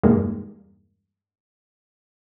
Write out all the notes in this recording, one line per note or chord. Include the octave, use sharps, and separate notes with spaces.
E2 G2 B2 G#3 A#3 D#4